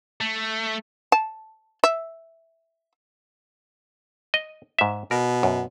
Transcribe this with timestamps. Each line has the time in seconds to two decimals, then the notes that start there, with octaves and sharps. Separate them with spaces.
0.21 A3
1.12 A5
1.84 E5
4.34 D#5
4.79 G#2 E5
5.11 B2 A#4
5.43 F#2